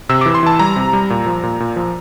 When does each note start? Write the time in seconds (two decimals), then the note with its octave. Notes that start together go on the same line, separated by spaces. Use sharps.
0.09 C3 E6
0.21 D6
0.26 E3
0.34 C6
0.43 E3 A5
0.59 G3 A#5
0.76 C3
0.93 G3
1.10 A#2
1.26 F3
1.43 A#2
1.60 A#2
1.76 F3